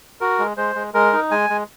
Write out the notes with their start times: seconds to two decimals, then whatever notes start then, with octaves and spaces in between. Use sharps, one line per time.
0.21 F#4 A#4
0.39 G#3
0.57 G#3 C5
0.75 G#3
0.94 G#3 A#4
1.13 D#4
1.31 G#3 G#5
1.50 G#3